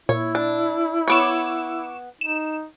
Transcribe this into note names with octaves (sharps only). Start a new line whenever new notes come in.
A#2 E4 C#5
D4
B3 C#5 C#6 D6 E7
D#4 E7